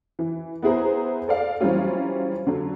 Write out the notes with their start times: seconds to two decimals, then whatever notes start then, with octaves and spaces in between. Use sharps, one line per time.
0.19 E3
0.63 B3 E4 G#4 C5 A#5
1.28 A4 D5 F5
1.61 E3 F#3 G3 C4 C#4 F4
2.47 D3 F#3